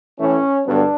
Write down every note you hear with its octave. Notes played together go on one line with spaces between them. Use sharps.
A2 E3 A3 C#4
G2 D3 F#3 B3 D4